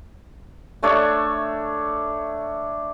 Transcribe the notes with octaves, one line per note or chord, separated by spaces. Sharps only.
A3 D4 C#5 A5